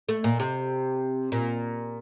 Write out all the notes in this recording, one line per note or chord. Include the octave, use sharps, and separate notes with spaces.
A3
A#2
C3
A#2